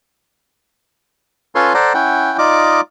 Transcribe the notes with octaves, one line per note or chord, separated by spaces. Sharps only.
C#4 F4 A4 B4 C#5 C6
A4 C5 D5 F#5 A#5
C#4 E4 F#5 G5
D#4 F4 D5 D#5 D6